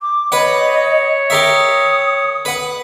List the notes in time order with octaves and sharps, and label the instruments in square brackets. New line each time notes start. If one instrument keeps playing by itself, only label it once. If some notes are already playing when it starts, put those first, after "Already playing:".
[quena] D6
[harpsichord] B4 F#5 [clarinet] C#5 [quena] D#5
[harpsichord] G4 A#4 E5 [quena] D#6
[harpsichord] B4 F#5